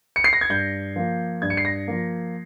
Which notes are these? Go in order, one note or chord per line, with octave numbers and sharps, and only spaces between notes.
C#7
C7
A#6
G#6
G2 G6
F3 A#3
G2 G#6
C#7
C7
A#6
F3 A#3